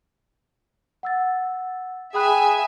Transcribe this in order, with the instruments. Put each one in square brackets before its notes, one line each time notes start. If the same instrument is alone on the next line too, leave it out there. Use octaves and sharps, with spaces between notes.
[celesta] F#5 E6 A6
[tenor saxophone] G#4 [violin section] E5 G#5 [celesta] G5 B5 F#6